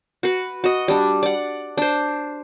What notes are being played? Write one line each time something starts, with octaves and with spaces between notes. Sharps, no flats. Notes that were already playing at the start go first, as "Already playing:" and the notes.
F#4 B4
F#4 D#5
G3 D4
D5 F#5
D4 C5